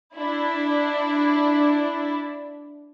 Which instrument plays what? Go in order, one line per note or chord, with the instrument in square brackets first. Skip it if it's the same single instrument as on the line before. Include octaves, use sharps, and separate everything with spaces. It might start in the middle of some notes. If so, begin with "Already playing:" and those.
[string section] D4 E4